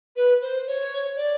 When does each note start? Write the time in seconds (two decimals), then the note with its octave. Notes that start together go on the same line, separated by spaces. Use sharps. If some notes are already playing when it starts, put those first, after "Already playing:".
0.16 B4
0.41 C5
0.67 C#5
1.17 D5